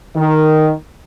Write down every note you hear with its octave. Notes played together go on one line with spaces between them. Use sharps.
D#3